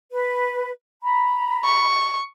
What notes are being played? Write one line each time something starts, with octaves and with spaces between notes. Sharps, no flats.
B4
A#5 B5
C#6